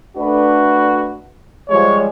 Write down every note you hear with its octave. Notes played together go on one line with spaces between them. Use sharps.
A3 D4 F#4 B4
F3 G3 G#3 C#5